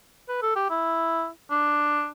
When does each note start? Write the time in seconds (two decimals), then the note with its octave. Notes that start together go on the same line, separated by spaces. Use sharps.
0.29 B4
0.42 A4
0.56 G4
0.70 E4
1.51 D4